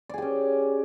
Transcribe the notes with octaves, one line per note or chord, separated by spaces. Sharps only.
C#4 G4 G#4 D5